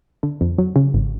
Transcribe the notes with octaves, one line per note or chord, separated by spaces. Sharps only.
D3
F2
F#3
C#3
G#1